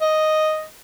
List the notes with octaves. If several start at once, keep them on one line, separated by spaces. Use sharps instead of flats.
D#5